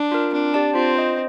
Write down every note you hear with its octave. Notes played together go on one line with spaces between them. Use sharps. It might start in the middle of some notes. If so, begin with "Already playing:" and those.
Already playing: D4
F4 A#4
C4 D4
G4 D5 A5
C4 F4
C5 D#5